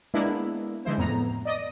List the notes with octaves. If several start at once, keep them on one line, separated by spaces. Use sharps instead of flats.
G#3 A#3 B3 D4 E4
D3 E3 G#3 E4 C5
F2 A2 B3 A#5
D5 D#5 D#6 A#6